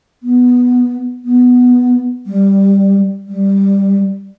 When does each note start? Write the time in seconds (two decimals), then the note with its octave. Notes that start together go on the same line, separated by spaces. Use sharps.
0.23 B3
1.25 B3
2.27 G3
3.28 G3